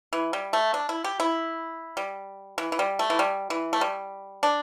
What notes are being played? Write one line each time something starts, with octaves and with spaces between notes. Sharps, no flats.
E3
G3
A3
D4
E4
G4
E4
G3
E3
E3
G3
A3
E3
G3
E3
A3
G3
D4